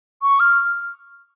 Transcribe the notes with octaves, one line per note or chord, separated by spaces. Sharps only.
C#6
F6